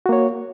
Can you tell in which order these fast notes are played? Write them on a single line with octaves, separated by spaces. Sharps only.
F#4 A#3 C#5